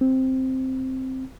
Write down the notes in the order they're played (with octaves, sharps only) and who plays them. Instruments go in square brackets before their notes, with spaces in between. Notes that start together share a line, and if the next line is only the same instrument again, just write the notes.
[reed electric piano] C4